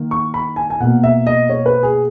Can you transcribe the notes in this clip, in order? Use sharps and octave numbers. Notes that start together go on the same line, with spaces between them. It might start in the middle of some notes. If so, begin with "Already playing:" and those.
Already playing: D#3 A#3
C#6
B5
G#5
G#5
B2 A#3 F#5
E5
D#5
C#5
B4
G#4